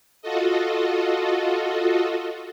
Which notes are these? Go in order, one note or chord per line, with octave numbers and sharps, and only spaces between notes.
F4 F#4 A4 D#5